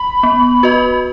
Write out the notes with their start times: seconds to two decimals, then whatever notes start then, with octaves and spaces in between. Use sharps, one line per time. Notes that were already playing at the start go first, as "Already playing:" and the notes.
Already playing: B5
0.23 B3
0.63 F#4 B4 D#5